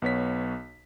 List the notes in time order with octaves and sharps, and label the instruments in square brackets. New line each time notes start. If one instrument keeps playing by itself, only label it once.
[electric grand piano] B1 B3 C#5 B6